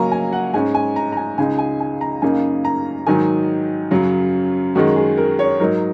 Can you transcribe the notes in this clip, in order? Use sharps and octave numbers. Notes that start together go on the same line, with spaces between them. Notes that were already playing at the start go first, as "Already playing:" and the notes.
Already playing: C#3 F#3 A#3 C#4 G#5 A#5
G#5
F#5
G#2 G#3 C#4 G#5
G#5
A#5
A#5
G#5
C#2 C#3 G#3 D#4 G#5
G#5
G#5
A#5
F#2 C#3 A#3 D#4 G#5
A#5
G#2 D#3 F#3 D#4 G#5
F#2 C#3 F#3
F#2 D#3 G#3 F#4
G#4
A#4
C#5
G#2 F#3 D#4 A#4